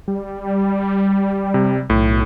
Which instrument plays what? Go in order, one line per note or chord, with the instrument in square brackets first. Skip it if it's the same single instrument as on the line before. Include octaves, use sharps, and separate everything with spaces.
[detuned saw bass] G3
[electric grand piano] C3
[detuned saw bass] B1 [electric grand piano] A2